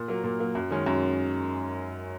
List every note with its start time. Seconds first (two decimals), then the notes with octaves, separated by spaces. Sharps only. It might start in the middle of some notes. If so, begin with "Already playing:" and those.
Already playing: A#2
0.08 F#3 A#3
0.24 A#2
0.39 F#3 A#3
0.55 F#2
0.71 D#3 G#3 C#4
0.86 F#2